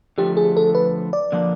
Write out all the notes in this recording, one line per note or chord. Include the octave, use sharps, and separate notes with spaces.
D3 F3 A3 G4
G#4
A4
B4
D5
D3 F3 A#3 D4